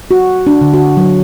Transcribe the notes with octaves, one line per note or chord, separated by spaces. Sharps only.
F#4
D4
D3
F#4
F#3